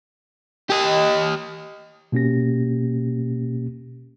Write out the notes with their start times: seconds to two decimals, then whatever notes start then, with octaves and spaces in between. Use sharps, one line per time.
0.70 G4 D#5
2.12 B2 A#3 C#4 G4 A#6